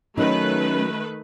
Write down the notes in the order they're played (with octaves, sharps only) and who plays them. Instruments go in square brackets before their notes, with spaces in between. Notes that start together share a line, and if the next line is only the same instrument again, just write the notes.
[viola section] D#3 A3 B4 [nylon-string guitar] F#3 D#4 [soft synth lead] C#4